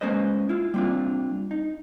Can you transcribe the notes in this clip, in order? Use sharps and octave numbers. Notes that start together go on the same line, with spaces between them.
G#3 A#3 C#4 B4 C5 D#5
E4 F4
G3 A#3 C4 D4 F4
D#4